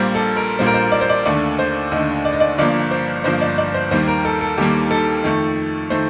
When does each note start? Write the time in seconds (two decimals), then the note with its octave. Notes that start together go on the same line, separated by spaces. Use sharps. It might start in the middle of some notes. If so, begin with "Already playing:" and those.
Already playing: A#1 A#2 G3 A#3 C5
0.15 A4
0.36 A#4
0.59 A#1 A#2 G3 A#3 C5
0.66 A#4
0.74 C5
0.92 D5
1.01 C5
1.10 D5
1.25 D#2 D3 A3 D5
1.59 C5
1.91 D#2 D3 A3 D#5
2.25 D5
2.33 D#5
2.40 D5
2.58 G1 G2 F3 A#3 D5
2.91 C5
3.24 G1 G2 F3 A#3 C5
3.41 D5
3.58 D5
3.74 C5
3.91 D#2 D#3 G3 A#3 C5
4.08 A#4
4.25 A4
4.41 A4
4.58 D#2 D#3 G3 A#3 G4
4.91 A4
5.24 F2 D#3 A3
5.90 D#3 A3 C5